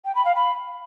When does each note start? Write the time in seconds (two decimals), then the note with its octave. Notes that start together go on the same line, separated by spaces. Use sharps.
0.05 G5
0.15 B5
0.25 F5
0.35 B5